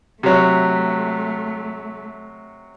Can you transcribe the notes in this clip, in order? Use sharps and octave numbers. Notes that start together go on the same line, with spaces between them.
C3 F#3 A3